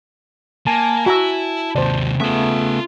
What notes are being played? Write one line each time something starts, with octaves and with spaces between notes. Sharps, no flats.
A#3 G#5 A5
E4 F#4 A#5 E6
D#2 C3 C5 D5
C#3 A3 B3 F4 E5